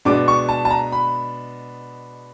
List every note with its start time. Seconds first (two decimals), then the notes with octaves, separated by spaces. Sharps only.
0.05 B2 G#3 B3 D4 D6
0.28 C#6
0.49 A5
0.65 A5
0.70 A#5
0.92 B5